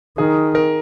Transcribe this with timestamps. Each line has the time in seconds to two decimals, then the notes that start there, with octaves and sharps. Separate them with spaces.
0.18 D#3 G#4
0.55 A#4